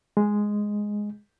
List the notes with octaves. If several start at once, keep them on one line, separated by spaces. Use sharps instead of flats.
G#3